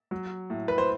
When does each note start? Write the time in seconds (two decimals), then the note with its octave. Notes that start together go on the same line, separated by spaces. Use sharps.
0.11 F#3
0.50 A2
0.68 B4
0.78 C5